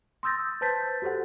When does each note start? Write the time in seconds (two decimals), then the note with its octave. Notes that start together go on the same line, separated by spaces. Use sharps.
0.23 C6 D#6 E6 G6 A6 A#6
0.61 B4 C5 A5 G6 A6 B6
1.02 F#4 G4 A4 C5 F#5